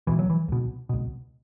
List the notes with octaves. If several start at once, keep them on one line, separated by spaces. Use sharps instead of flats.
C#2 B2 E3
F#3
E3
C#2 B2
C#2 B2